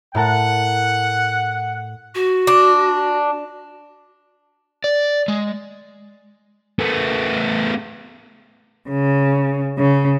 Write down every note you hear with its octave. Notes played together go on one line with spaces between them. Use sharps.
A2 A#4 F#5 A5
F#4
D4
D5
G#3
A3 B3
C#3
C#3